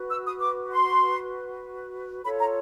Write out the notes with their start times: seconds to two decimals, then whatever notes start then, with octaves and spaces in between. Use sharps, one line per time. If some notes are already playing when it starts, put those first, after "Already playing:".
Already playing: F#4 B4
0.09 E6
0.25 D#6
0.40 D6
0.71 C6
2.24 F4 A4 C#5 B5
2.39 A#5